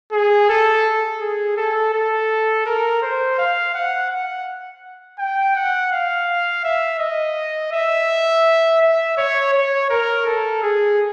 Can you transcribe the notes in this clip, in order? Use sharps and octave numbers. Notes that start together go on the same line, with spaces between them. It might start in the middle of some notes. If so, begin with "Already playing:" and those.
G#4
A4
G#4
A4
A4
A#4
C5
F5
F#5
F#5
G5
F#5
F5
E5
D#5
E5
E5
C#5
C#5
A#4
A4
G#4